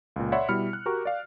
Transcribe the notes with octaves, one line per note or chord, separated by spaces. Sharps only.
C#2 A#2
C#5 D5 E5 F#5 B5 C6
B2 G3 E4 B5 F6 C#7
F#6
F#4 G4 A#4 C#6
D5 F5